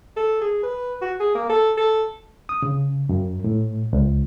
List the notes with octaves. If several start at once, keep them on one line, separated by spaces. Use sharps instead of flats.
A4
G#4
B4
F#4
G#4
A#3
A4
A4
D#6
C#3
F#2
A2
C#2